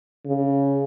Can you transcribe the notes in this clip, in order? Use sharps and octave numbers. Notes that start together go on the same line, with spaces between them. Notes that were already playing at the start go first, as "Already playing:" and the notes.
C#3